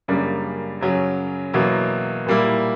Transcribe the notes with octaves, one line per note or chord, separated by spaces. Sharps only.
F#2 C#3 G3 A#3 D4
F#2 C#3 F#3 C#4
E2 B2 F#3 A#3 E4
A#2 G3 A#3 E4